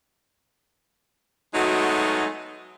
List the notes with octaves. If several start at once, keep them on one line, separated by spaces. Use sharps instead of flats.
F#3 G#3 A3 B3 D#4 F#4